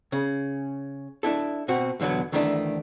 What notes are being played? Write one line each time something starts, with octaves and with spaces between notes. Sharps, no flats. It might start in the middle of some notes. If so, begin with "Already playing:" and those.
C#3
D4 E4 A4
B2 C4 F#4
B1 E2 D3 F#3 B3
D2 D#3 E3 A3 C#4 D4